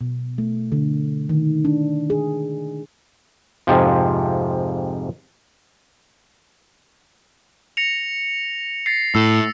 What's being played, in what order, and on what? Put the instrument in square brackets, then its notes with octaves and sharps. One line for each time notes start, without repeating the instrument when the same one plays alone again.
[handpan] B2
A3
D3
D#3
D4
G#4
[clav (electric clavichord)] F2 G#2 C3 F3
[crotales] A#6 C#7 F7
A6 A#6 C7
[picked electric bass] A2 [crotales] E6